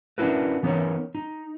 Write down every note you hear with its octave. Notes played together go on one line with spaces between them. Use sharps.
C#4 D4 E4 F#4 A#4 B4
E3 B3 C#4 D#4 A#4 C#5
D#4